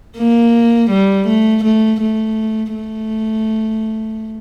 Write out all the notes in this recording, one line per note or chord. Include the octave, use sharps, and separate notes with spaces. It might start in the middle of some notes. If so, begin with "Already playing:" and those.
A#3
G3
A3
A3
A3
A3